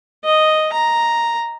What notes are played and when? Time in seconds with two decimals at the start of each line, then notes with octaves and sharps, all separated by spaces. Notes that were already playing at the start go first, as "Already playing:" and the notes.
0.25 D#5
0.73 A#5